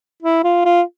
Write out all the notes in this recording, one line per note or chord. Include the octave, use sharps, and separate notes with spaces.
E4
F4
F4